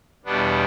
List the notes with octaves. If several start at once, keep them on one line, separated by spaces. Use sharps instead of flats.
E2 B2 G3 B3 D4